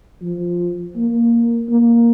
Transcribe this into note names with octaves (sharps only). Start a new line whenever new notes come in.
F3
A#3
A#3